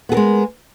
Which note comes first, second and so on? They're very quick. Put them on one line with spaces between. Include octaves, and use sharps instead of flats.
B3 G#4 A#4 G#3